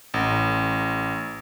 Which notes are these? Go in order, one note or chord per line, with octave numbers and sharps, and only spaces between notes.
A1